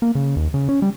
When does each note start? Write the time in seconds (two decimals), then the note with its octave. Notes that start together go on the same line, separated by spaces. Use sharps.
0.02 A#3
0.15 C#3
0.36 D#2
0.54 C#3
0.69 C#4
0.82 G3